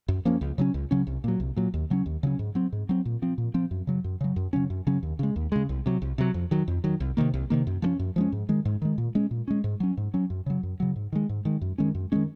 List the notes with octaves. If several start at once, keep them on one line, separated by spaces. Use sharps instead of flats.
F#2
F3 A#3 C#4
C#2
C#3 F#3 C#4
C#2
C#3 F#3 C#4
C2
A#2 F#3
C2
A#2 F#3
D#2
C#3 F#3 C#4
D#2
C#3 F#3 C#4
G#2
F#3 C4
G#2
F#3 C4
A#2
F3 C4
A#2
F3 C4
F#2
C#3 F#3
F#2
C#3 F#3
F#2
C#3 F#3 C#4
F#2
C#3 F#3 C#4
D#2
C#3 G#3
D#2
C#3 G#3
C2
C3 F#3
C2
C3 F#3
F2
D#3 F#3
F2
D#3 F#3
C2
C3 D#3 A#3
C2
C3 D#3 A#3
F#2
F3 G#3 C#4
F#2
F3 G#3 C#4
G#2
D#3 G#3
G#2
D#3 G#3
A#2
G#3 C#4
A#2
G#3 C#4
G#2
F#3 C#4
G#2
F#3 C#4
F#2
C#3 F#3
F#2
C#3 F#3
G#2
D#3 G#3
G#2
D#3 G#3
F#2
D#3 G#3 C#4
F#2
D#3 G#3 C#4